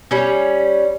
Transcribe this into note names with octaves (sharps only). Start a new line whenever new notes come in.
G3 C#4